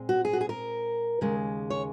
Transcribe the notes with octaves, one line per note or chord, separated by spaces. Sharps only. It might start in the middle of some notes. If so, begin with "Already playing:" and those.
Already playing: A#2 G#3 C4
F#4
G#4
F#4
G#4
A#4
D#2 C#3 G#3
C#5